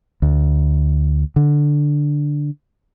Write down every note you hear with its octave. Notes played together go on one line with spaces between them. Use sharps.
D2
D3